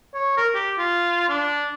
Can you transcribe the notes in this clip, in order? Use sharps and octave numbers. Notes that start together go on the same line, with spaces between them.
C#5
A#4
G4
F4
D4